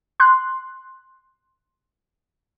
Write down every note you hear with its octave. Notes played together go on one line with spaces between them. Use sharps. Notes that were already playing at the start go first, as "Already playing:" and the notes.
C6 F#6